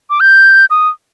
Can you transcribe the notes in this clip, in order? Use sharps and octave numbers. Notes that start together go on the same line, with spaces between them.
D6
G6
D#6